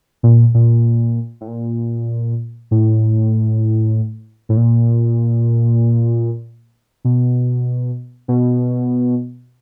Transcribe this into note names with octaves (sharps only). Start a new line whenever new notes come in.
A#2
A#2
A2
A#2
A2
A2
A#2
B2
B2